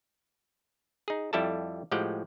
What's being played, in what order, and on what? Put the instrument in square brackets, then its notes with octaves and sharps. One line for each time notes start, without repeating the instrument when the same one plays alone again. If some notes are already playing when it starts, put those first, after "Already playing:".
[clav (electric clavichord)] D#4 G#4
F2 G3 E4 G4 A4 A5
A2 F3 G#3 G4 F#5 G5